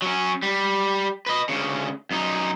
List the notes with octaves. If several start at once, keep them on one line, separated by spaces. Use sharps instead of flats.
F#3 C#4
G3
B4 D#5
D2 C#3
F#2 D#4